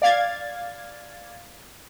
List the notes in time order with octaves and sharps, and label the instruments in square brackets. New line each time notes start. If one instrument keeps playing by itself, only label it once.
[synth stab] D5 F5 G#6 A6